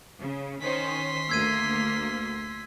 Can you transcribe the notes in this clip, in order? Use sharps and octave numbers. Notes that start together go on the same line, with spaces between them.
C#3
D#3 C#4 C5 C6 B6
D2 A#3 E6 G#6 D#7